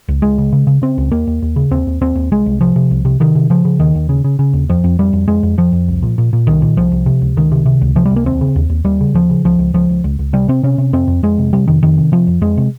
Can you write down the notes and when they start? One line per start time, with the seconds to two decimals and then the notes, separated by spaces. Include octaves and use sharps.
0.08 C#2
0.22 C#2 G#3
0.38 C#3
0.52 C#3
0.67 C#3
0.82 C#3 C4
0.98 C#2
1.12 D#2 A#3
1.27 D#2
1.42 D#2
1.56 C#3
1.71 D#2 C4
1.87 D#2
2.01 D#2 C4
2.15 D#2
2.31 C2 G#3
2.46 C2
2.61 C3 F3
2.76 C3
2.91 C2
3.05 C3
3.20 C3 D#3
3.35 C3
3.50 C#3 F3
3.65 C#3
3.79 D#2 D#3
3.95 D#2
4.09 C#3
4.24 C#3
4.39 C#3
4.53 D#2
4.69 F2 F3
4.84 F2
4.99 F2 G3
5.13 F2
5.28 F2 G#3
5.43 F2
5.58 F2 F3
5.72 F2
5.88 C2
6.03 A#2
6.18 A#2
6.33 A#2
6.47 C2 D#3
6.62 A#2
6.77 C2 F3
6.92 C2
7.06 C3
7.22 C#2
7.37 C#2 D#3
7.52 C3
7.66 C3
7.81 C#2
7.96 C3 F3
8.06 G3
8.11 C#2
8.16 A#3
8.25 D#2 C4
8.41 C#3
8.56 D#2
8.70 D#2
8.84 D#2 G3
9.01 C#3
9.14 D#2 F3
9.30 C#3
9.44 C#2 F3
9.59 C#2
9.74 C#2 F3
9.89 C#2
10.04 C#2
10.19 C#2
10.33 C3 G3
10.48 C3 C4
10.63 C3 C#4
10.78 C3
10.93 F2 C4
11.07 F2
11.23 F2 G#3
11.38 C3
11.53 C3 G3
11.68 F2 D#3
11.83 F2 D#3
11.97 C3
12.12 C3 F3
12.27 F2
12.41 F2 G#3
12.57 C3